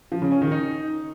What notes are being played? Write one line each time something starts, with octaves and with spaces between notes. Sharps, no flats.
F3
C#3
C#4
D#3
D#4